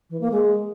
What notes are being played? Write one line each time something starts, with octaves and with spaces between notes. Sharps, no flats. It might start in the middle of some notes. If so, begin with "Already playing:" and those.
E3
A#3
G#3